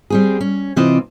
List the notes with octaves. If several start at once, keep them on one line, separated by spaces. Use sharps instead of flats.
G3 C4 G#4
C#4
C3 E3 C4 F4 D5 D#5